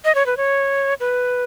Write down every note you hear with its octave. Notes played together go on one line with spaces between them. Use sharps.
D#5
C#5
B4
C#5
B4